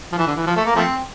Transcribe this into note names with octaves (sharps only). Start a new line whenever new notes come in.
F3
E3
D3
E3
F3
A3
A#3
F3 A3 C4